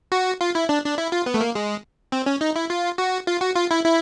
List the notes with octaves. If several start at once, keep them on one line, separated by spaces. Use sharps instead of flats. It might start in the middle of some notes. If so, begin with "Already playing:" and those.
F#4
F4
E4
D4
D4
E4
F4
B3
A3
A#3
G#3
C4
C#4
D#4
E4
F4
F#4
F4
F#4
F4
E4
E4